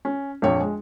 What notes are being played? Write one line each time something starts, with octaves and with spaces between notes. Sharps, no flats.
C#4
A#1 F2 C#5 G5
G#3